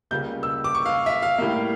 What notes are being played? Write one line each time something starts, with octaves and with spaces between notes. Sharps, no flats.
C#2 C#3 G3 A#3 G6
E6
D6
C#6
F5
E5
F5
A2 G3 A#3